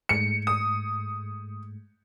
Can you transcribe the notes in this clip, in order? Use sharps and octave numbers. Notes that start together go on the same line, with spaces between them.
G#2 G#3 A3 C#7
D#6